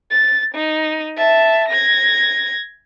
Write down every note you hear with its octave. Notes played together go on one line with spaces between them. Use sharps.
A6
D#4
E5 A5
G#6 A#6